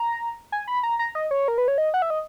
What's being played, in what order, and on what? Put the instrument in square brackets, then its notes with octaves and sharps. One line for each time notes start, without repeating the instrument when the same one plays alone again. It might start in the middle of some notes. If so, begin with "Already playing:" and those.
Already playing: [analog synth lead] A#5
G#5
B5
A#5
A#5
D#5
C#5
A#4
B4
C#5
D#5
F#5
E5
D#5